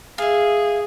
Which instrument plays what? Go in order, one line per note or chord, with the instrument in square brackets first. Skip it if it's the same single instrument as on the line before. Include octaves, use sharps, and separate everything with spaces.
[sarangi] G#4 [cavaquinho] E5 F5